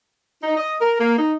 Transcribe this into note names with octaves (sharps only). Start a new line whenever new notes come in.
D#4
D#5
A#4
A#3
D#4